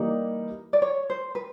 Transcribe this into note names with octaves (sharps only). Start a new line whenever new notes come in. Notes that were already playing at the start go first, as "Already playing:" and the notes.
Already playing: E3 G3 A#3 D#4 D5
D5
C#5
C5
B4